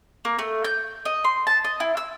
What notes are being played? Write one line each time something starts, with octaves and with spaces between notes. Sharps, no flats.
A#3
A3
G6
D#5
C6
A5
D#5
E4
E6